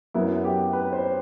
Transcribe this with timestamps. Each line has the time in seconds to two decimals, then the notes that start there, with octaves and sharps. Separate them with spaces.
0.14 F#2 F#3 B3 E4
0.44 G4
0.73 B4
0.93 C5